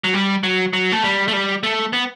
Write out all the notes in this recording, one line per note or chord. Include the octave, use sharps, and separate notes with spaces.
F#3
G3
F#3
F#3
A3
G3
A3
G3
A3
B3